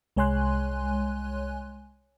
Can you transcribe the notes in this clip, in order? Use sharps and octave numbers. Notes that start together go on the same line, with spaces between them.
C2 G#3 C#5 G#5 C6 F#6